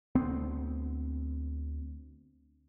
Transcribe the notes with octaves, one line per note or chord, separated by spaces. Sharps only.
D2 B3 C4